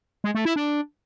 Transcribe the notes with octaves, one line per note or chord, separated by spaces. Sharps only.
G#3
A3
E4
D4